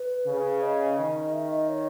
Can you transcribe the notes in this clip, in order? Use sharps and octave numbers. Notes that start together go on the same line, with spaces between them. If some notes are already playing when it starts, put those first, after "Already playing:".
Already playing: B4
C#3
D#5
D#3
E5
D#5
C#5